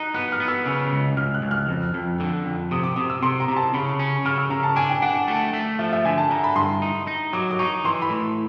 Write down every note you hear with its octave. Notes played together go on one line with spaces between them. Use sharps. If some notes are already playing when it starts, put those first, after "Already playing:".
Already playing: D#4 F#6
B3 F#6
F6
B3
E6
C#3
C#2
C#2 F6
F#6
C#2
F6
F2
F2
D3
F2
C3 D#6
D6
C3 D#6
E6
C3 C6
A#5
C3
A5
C#3 B5
C#4
C#3 F6
E6
C#3 A#5
A5
D4 G#5
G5
D4 F#5
F#5
A3
A3
F3 E5
E5
D3 G#5
A5
D3 A#5
B5
G2 C6
D#4
D#4
F#3 D6
D6
D#4 C#6
E3 C6
B5
A2